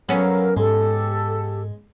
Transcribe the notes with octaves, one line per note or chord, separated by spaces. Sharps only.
F#3 B3 C#4 A4 A#4 F5
G#2 G#3 G4 A4